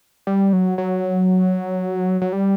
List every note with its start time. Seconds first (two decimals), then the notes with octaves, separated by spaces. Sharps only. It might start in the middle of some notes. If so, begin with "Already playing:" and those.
0.27 G3
0.53 F#3
0.78 F#3
2.21 F#3
2.33 G3